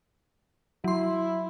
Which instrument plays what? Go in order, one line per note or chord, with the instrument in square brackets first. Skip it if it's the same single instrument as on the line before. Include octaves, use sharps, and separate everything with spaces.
[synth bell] F#3 C6 [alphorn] E4